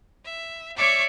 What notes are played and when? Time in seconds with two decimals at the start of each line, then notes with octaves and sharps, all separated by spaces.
0.24 E5
0.75 C#5 D5 E5 D6